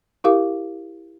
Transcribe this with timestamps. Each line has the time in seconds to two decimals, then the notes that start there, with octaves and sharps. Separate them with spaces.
0.24 E4 G4 A#4 F5 D6